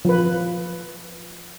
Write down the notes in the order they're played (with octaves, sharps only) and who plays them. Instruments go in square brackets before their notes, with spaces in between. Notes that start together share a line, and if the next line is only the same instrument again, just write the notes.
[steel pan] F3 B4